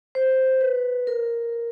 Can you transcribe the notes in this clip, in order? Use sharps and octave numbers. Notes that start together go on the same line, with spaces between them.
C5
B4
A#4